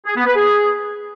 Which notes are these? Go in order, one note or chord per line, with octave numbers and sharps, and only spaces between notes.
G#4
B3
B4
G#4